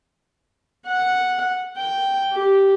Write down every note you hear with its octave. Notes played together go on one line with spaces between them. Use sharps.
F#5
G5
G4